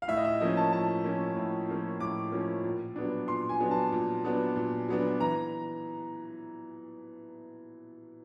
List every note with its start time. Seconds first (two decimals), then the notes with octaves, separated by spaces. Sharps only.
0.02 F5
0.08 A2 E5
0.17 D#5
0.25 E5
0.40 F3 A#3 C#4 D#5
0.57 A5
0.73 A2 A5
1.04 F3 A#3 C#4
1.37 A2
1.68 F3 A#3 C#4
2.00 A2 D6
2.32 F3 A#3 C#4
2.64 A#2
2.96 F#3 B3 D4
3.28 A#2 C6
3.49 G#5
3.60 F#3 B3 D4
3.71 A5
3.92 A#2
4.24 F#3 B3 D4
4.56 A#2
4.88 F#3 B3 D4
5.20 E3 A#5